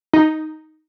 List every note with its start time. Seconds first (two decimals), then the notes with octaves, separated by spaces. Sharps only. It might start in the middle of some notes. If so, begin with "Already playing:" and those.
0.13 D#4